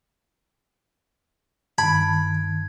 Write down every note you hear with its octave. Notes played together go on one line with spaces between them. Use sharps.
G2 D#3 A5 B5 G#6